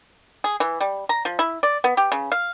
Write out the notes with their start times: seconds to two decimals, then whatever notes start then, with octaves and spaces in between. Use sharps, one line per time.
0.44 G#4
0.60 E3
0.80 G3
1.09 A#5
1.25 F3
1.39 E4
1.63 D5
1.84 B3
1.97 G4
2.12 C#3
2.32 F5